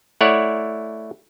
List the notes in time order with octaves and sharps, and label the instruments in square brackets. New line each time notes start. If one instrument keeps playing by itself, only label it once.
[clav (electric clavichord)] A3 E4 C#5 D5 F#5